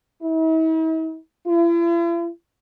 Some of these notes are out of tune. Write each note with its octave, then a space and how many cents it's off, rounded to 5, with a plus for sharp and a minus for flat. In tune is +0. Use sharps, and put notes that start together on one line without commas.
E4 -45
E4 +45